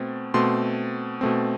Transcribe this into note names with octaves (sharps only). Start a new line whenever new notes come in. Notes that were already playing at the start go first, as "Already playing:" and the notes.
Already playing: B2 A3 C4
B2 A3 C4 C6
B2 A3 C4